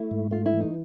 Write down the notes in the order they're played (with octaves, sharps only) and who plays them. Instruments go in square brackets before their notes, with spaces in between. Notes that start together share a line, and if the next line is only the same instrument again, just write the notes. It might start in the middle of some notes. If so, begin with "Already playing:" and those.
Already playing: [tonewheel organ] A3 [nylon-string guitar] E4
[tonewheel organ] G#2
[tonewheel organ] A3 [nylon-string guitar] F4
[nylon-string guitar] E4
[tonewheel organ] E3
[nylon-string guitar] D#4